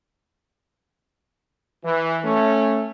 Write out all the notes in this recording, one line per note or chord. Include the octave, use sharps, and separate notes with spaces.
E3
A3 C#4